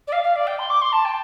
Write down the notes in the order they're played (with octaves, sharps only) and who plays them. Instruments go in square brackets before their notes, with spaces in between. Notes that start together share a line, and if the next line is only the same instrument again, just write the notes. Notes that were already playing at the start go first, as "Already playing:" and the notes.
[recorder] D5
F5
F5
D5
G5
C6
D6
C6
A5
G5